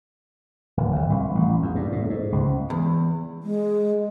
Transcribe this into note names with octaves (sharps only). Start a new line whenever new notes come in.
D1
G#1
C2
A1
E2
G2
A2
G#2
C#2
E2
G#3